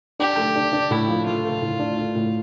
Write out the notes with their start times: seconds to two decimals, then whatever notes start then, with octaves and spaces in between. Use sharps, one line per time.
0.19 D4 G4
0.37 A3
0.56 D4
0.73 D4
0.91 A2 E4
1.08 F3
1.26 A3 F4
1.44 A3
1.62 A2
1.80 D4
1.98 D4
2.15 A2